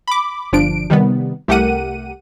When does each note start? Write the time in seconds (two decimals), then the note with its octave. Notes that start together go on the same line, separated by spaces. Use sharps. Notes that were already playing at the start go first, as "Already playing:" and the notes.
0.08 B5 D6
0.52 G1 F3 D4 D7
0.90 C3 D#3 G3 B3
1.48 C2 A3 G4 A#4 F#5 D#7